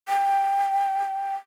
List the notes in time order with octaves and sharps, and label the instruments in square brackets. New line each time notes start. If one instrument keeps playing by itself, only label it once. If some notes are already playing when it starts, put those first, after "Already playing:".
[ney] G5